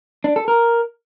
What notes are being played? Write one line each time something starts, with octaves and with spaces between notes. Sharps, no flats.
D4
A4
A#4